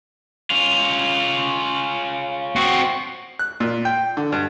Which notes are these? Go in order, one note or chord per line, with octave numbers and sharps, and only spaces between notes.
C#4 F4
C4 F#4
F#6
A#2
G5
D3
G2